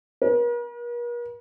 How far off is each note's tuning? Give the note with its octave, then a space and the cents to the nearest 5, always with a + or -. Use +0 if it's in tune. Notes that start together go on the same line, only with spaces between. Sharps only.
A#4 +45